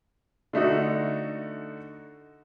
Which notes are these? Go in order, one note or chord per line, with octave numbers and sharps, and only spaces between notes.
D3 A3 D#4 F#4